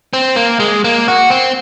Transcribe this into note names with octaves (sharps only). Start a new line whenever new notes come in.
C4
A#3
G#3
A#3
F#4
C4